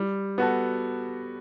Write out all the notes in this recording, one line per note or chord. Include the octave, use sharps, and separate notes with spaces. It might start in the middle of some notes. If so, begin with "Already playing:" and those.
Already playing: G3
B3 F#4 A4